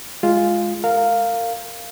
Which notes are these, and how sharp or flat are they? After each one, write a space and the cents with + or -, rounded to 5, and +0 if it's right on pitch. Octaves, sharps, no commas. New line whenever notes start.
G#3 +0 F4 +0
A#4 -30 F5 +0